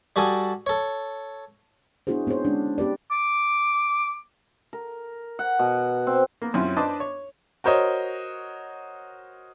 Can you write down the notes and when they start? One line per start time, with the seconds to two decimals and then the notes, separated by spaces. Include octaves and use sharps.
0.16 G3 F#4 A4 G#5 D#6
0.67 A4 C#5
2.07 B3 D4 E4 F#4 G#4 C5
2.27 B3 C4 D#4 G#4 C5 C#5
2.45 G#3 C#4 D4
2.78 B3 G4 B4 D5
3.11 D6
4.73 A#4
5.39 F#5
5.59 B2
6.07 C4
6.42 A#3 B3
6.54 F#2 C4 C#4 E4 F4
6.76 D4 B4 C5 D#5 A5 D6
7.00 C#5
7.64 F#4 A#4 C5 C#5 D#5